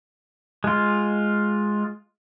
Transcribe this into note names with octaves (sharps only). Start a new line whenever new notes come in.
G#3 F4